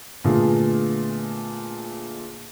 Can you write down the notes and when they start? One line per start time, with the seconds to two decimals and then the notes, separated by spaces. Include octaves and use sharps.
0.24 A#2 D3 A3 B3 F4 G#4